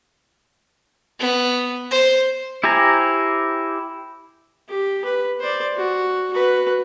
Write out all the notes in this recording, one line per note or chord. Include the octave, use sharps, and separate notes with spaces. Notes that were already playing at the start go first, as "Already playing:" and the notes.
B3
C5
E4 G4 C5 G#5 A#5
G4
B4
C5 D5
F#4
F#4 B4